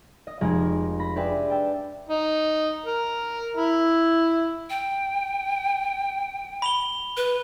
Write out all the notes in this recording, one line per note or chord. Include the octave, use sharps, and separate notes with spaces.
D#5
F1 G#3 G#4 D#5 G#6
B5 A#6 B6
D4 G4 G#4 B4 D5 E5
G5 A5 E6
D#4
A#4
E4
G5
B5 F7 G7
B4